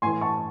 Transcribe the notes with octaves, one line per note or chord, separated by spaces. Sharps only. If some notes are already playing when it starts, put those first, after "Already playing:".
A2 E3 G#5 C6
A5 C#6